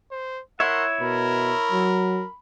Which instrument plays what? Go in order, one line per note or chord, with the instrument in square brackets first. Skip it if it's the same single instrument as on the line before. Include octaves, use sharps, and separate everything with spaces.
[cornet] C5
[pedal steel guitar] E4 C#5 E5 [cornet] A#4 [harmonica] F#5 C6
[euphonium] B2 [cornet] A#4 [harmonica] B5
[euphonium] F#3